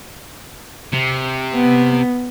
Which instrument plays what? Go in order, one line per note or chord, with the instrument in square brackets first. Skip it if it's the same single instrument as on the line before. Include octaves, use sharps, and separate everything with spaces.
[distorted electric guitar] C3
[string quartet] B3